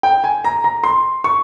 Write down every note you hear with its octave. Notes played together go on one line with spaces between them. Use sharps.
G5
G#5
A#5
A#5
C6
C#6